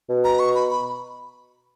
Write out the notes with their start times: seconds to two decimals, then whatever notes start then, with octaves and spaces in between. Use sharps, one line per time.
0.09 B2
0.24 A#5
0.39 C#6
0.55 B5
0.70 B5